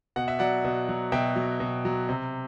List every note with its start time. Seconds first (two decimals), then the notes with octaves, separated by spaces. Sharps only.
0.16 B2 F#5
0.28 E5
0.39 F#3 D5 F#5
0.64 B2
0.89 F#3
1.12 B2 E5 G5
1.36 F#3
1.60 B2
1.85 F#3
2.09 C3